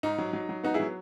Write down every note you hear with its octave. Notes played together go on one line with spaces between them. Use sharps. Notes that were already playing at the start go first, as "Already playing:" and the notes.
G#2 D#4
F#3
F#3
F#3
B3 D#4 F#4
E4 G#4
F#3